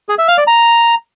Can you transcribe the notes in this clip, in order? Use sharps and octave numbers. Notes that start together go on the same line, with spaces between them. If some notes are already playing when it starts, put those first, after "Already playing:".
G#4
E5
F5
D5
A#5